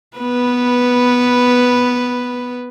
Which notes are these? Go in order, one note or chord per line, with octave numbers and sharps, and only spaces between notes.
B3 B4